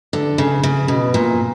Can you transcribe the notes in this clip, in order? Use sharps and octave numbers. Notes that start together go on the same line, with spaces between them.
D3
C#3
C#3
B2
A#2